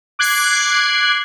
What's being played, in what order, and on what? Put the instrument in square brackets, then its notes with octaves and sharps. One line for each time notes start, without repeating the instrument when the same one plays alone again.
[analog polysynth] D6 F#6 G#6 C7